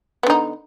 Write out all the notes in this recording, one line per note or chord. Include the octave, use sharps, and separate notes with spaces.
D3 B3 D#4